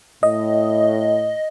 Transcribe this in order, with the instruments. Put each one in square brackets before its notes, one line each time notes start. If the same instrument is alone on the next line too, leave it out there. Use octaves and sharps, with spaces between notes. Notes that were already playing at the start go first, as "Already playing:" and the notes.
[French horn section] A2 [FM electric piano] D#5